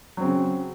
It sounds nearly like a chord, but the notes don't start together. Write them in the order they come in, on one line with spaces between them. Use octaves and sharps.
F#3 C4 C#3